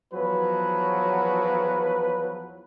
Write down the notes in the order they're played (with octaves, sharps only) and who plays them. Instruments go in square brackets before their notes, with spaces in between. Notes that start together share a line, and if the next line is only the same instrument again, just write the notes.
[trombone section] E2 F3 F#3 [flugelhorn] B4